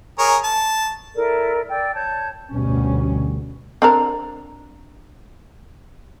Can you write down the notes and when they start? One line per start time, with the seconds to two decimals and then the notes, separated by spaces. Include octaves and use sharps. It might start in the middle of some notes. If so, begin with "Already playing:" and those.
0.19 G#4 A#4 C#5
0.44 A5
1.15 E4 A4 A#4 D5
1.69 D5 G5 E6
1.95 C#5 A5 G6
2.51 G1 D2 B2 G3 C#4
3.82 C4 D4 A#4